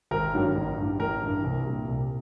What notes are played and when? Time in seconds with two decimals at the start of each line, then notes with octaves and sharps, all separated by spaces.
0.11 G#1 A#4
0.33 G2 D#3 F#3
0.55 A1
0.78 G2 E3
1.00 A1 A#4
1.22 G2 E3
1.44 C2
1.66 A#2 G3
1.89 C2